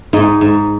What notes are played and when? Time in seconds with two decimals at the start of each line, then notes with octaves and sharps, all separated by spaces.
0.13 G#2 D#4
0.41 G#2